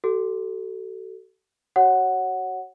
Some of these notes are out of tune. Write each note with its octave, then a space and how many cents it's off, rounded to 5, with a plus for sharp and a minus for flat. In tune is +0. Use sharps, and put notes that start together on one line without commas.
F#4 +45 A4 +0
F#4 +30 C#5 -15 F#5 +0